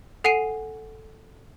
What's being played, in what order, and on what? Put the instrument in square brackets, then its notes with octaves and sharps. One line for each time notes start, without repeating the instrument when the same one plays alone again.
[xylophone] A4 F#5 G#5 C7 D#7